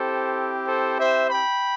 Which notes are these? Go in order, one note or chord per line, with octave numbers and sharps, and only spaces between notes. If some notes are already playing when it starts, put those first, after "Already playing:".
Already playing: C4 E4 G4 A4 C5
A4 C5
C5 E5
G5 B5